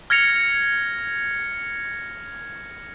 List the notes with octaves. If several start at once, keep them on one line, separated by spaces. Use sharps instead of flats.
F6 G#6 A#6 C#7 F7